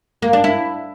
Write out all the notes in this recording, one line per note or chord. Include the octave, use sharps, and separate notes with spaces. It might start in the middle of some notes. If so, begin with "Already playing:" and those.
A#3
D4
E4